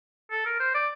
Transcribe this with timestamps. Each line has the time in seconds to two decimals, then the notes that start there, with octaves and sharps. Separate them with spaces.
0.31 A4
0.46 A#4
0.60 C5
0.74 D5